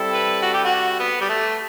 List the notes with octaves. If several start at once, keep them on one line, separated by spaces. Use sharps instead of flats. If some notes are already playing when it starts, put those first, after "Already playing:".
Already playing: G3 C4 E4 A4
B4
F#4
G4
F#4
B3
G3
A3